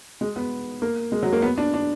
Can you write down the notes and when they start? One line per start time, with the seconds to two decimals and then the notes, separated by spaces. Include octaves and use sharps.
0.21 G#3
0.36 B3
0.82 A#3
1.12 G#3
1.23 F#3
1.33 A#3
1.42 B3
1.58 D4
1.74 D4